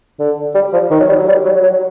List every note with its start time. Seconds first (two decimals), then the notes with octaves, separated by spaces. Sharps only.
0.19 D3
0.55 G3
0.73 F3
0.91 D#3
1.00 F#3
1.09 G3
1.19 F#3
1.28 G3
1.45 F#3
1.63 F#3